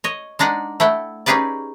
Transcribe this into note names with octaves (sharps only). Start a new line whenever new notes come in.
C#5 D#5
G#3 D4 D#4 D5 F#5
A3 E4 F#5 G5
C#4 D#4 G4 G#4 B4 D5